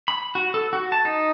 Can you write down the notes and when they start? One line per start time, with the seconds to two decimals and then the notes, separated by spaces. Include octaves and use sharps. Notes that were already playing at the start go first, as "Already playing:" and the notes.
0.08 B5
0.35 F#4
0.54 A4
0.73 F#4
0.92 A5
1.05 D#4